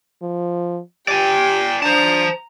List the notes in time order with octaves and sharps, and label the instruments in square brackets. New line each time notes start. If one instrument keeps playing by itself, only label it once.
[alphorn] F3
[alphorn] G4 [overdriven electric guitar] D5 G#5 [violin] G5
[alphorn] D4 [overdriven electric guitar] C5 A5 [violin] A#5